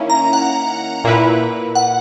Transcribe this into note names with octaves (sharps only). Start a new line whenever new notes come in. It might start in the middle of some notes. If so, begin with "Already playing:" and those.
Already playing: D#3 A#3 C#4 E4
A#5
F#5
A#2 A#3 E4 B4
F#5